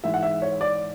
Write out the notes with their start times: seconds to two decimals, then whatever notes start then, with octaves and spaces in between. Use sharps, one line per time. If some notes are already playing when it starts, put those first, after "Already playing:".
0.04 G#2 E3 E5
0.14 F#5
0.23 E5
0.42 C#5
0.61 D5